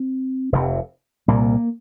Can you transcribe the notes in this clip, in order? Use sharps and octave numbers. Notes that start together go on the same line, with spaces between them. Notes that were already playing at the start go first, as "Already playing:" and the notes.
Already playing: C4
F1 F2 C3
C2 A#2 A#3